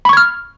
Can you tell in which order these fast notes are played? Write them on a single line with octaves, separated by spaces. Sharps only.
B5 C#6 G#6 F6